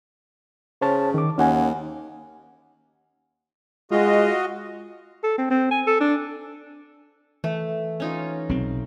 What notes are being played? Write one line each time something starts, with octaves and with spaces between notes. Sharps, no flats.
C#3 C5 C#5 A5
D#3 D6
D#2 C#4 F#5 G#5
G#3 F4 F#4 D#5
A4
C4
C4
G#5
A4
D4
E3 A3
C#4 D#4 F4
B1 C3 C4